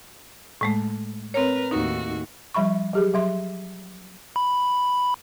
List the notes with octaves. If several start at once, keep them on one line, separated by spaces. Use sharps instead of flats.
A2 G#3 A3
C4 A#4 B4 C#5
D#2 A2 D#4 F#4
F3 G3 E5 B5 C#6
F#3 G4 G#4
F#3 E5 C6
B5